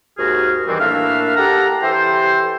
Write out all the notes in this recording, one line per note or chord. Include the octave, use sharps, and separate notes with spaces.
D#2 G#2 F#4 G#4 F6
E2 D#3 E3 G3 C4
A2 A#3 D4 E5 F5 F6
G4 A4 F#5 A#5
E3 G4 A4 C5